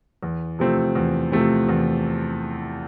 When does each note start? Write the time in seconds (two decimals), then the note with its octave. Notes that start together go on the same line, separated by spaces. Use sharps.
0.23 E2
0.59 C3 F3 A3 C4
0.95 E2
1.32 C3 F3 A3 C4
1.69 E2